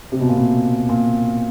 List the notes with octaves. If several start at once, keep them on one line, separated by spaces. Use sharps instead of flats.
C3
B2
A#2
B2
A#2